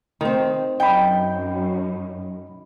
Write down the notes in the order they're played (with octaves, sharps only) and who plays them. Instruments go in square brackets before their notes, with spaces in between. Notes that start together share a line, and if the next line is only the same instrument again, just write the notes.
[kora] D#3 C4
[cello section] F#2 [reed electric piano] D#5 B5 [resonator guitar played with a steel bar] G5